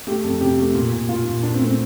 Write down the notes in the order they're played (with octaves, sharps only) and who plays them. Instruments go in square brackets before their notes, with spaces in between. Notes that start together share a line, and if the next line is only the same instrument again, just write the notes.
[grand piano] A3 G4
F2 A4
C3 G4
A3
A#2
A#2
A#2 F4
A#2
A#2 D4
C4
A3
C4